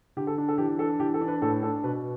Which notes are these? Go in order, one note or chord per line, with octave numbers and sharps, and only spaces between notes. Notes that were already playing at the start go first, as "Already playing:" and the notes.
D3 G4
A4
D4
A4
E3 G4
D4 A4
E3 G4
A4
D4
B4
A2 A4
D4 A4
B2 B4